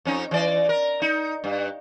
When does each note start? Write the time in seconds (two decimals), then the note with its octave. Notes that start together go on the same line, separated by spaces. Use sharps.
0.05 F2 C#4 D#4
0.31 E3 D5
0.69 A#4
1.02 D#4
1.44 G2